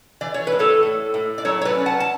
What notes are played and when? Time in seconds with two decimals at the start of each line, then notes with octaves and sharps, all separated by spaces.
0.21 E3 D5
0.34 C#5
0.47 B4
0.52 A2
0.59 A4 C#5
0.83 A2
1.14 A2
1.38 D5
1.45 F#3 A4 C#5
1.61 C#5
1.65 B4 D5
1.76 C#4
1.86 F#5 A5
2.00 A5